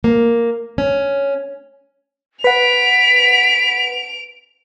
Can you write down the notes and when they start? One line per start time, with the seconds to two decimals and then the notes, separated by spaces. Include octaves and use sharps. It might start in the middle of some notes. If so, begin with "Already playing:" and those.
0.04 A#3
0.78 C#4
2.44 B4 F#5 B6 D7 F7